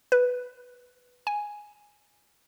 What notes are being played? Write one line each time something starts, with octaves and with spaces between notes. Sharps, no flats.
B4
G#5